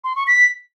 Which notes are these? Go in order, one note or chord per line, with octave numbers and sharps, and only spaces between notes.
C6
C#6
B6